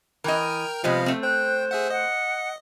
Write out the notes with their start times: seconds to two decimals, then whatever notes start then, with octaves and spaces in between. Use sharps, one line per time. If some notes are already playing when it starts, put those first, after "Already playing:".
0.24 E3 A#4 D#5 G5 F6
0.84 C3 F3 G3 G#3 B3 D#5 F5
1.06 A3 C4
1.23 C5 G5 F#6
1.71 G#4 E5 F#5
1.90 D#5 F#5